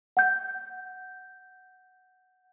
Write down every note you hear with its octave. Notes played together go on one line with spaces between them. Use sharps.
F#5 G6